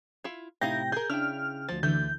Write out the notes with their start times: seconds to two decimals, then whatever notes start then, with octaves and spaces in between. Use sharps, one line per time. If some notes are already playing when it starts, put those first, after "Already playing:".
0.24 E4 F4
0.61 A2 C3 D#4 E4 F5 G5 G6 A#6
0.92 G#4 A#4 G6
1.10 C#3 D4 E4 G5 F6
1.69 D2 F3 A6
1.83 D3 E3 A3 G6